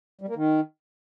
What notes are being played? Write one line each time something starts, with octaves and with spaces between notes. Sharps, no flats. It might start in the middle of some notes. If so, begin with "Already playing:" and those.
G3
A#3
D#3